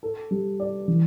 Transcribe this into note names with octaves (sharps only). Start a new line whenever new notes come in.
A4
G3
D5
E3